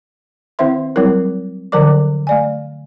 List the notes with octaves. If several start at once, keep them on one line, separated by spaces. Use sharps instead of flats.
D#3 C4 E4 C5 E5 C6
F#3 G3 C4 E4 A#4
D3 F3 F#3 A#4 D5 D6
A3 D5 G#5